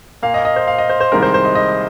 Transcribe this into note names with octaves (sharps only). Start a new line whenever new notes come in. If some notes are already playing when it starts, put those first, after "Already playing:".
A#2 A#3 F5
D#5
D#5
C5
F5
D#5
C5
C5
C2 C3 D#3 G#3 A#4
C5
C5
D#5
D#5